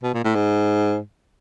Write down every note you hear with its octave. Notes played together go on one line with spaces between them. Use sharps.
B2
A#2
A2
G#2